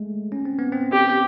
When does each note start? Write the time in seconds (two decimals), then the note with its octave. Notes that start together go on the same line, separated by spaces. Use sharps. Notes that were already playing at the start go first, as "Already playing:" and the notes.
Already playing: G#3 A3
0.32 C#4
0.45 C4
0.59 B3
0.72 C4
0.92 G4